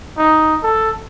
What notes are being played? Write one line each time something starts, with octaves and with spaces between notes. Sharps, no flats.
D#4
A4